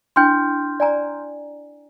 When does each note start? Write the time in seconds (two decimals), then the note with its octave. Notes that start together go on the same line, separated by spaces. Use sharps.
0.16 D4 E4 G5 C6 F6 G6
0.80 D5 G#5 A#5